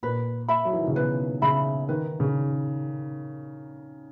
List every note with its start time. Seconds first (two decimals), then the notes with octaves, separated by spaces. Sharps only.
0.03 A#2 B4
0.48 E5 B5
0.65 F#3
0.73 E3
0.80 D#3
0.87 C#3
0.95 B2 B4
1.42 C#3 E5 B5
1.89 D#3 B4
2.20 C#3